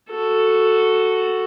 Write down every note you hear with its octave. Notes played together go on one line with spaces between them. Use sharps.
F#4 A4